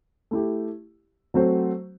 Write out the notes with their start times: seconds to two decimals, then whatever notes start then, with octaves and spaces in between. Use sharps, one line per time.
0.31 A3 E4 G4
1.34 F#3 A3 C4 F#4 C5